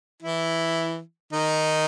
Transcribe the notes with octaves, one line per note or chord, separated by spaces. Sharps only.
E3 E4
D#3 D#4